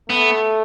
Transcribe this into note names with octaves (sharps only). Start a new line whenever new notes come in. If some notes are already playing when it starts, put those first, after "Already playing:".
A3 B3